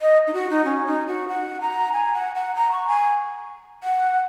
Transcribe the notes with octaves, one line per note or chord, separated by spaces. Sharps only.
D#5
D#4
F#4
D#4
C#4
D#4
F#4
F#5
A#5
G#5
F#5
F#5
A#5
C#6
G#5
F#5